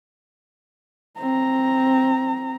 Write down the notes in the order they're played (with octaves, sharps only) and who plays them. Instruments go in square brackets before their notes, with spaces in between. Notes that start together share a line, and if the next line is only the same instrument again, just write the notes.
[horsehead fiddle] C4 A#5